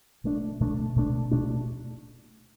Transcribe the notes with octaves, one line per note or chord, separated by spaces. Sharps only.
B2 A3 D4
B2 A3 D4
B2 A3 D4
B2 A3 D4